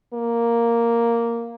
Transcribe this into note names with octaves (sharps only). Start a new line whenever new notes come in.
A#3